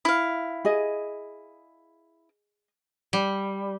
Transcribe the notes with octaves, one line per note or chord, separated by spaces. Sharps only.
E4 F5
G#4 D#5
G3